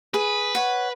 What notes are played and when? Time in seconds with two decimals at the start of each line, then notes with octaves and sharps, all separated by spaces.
0.14 G#4 B4
0.55 C#5 F#5